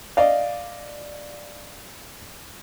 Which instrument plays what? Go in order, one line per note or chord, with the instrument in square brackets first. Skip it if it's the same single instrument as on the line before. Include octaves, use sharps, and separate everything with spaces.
[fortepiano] D5 D#5 F5